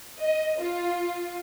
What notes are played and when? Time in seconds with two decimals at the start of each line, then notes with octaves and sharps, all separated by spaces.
0.20 D#5
0.61 F4